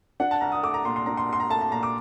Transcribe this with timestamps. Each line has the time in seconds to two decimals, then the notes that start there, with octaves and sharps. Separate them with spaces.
0.20 D4 F#5
0.31 A5
0.41 C2 A#5
0.52 D#6
0.63 A3 D6
0.74 A#5
0.85 A#2 C6
0.96 C6
1.06 D4 A#5
1.17 C6
1.29 C2 C6
1.40 A#5
1.50 A3 A5
1.61 A5
1.72 A#2 A#5
1.83 D6